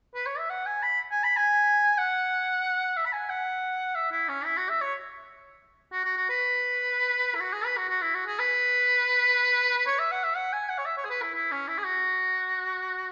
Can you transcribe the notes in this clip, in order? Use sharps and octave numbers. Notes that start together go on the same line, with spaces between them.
B4
C#5
E5
F#5
G#5
B5
G#5
B5
G#5
F#5
E5
B5
G#5
F#5
E5
E4
C#4
E4
F#4
E5
C#5
F#4
F#4
F#4
B4
E4
F#4
G#4
B4
F#4
F#4
E4
F#4
G#4
B4
B4
C#5
E5
F#5
E5
F#5
G#5
F#5
C#5
E5
C#5
G#4
B4
E4
E4
C#4
E4
G#4
F#4